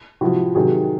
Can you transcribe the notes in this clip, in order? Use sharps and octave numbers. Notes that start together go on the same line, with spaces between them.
C3 F3 E4 F#4
C3 D#3 F#3 F#4 G#4